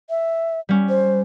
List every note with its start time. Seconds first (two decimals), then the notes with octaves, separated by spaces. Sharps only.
0.10 E5
0.69 G3 C#4
0.89 C5